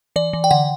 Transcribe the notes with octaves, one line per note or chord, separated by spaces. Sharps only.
E3 D5
E3
G5
D3 F#5